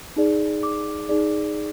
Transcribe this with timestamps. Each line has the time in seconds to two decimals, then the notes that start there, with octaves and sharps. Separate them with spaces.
0.16 D#4 G#4 D5
0.63 D6
1.09 D#4 G#4 D5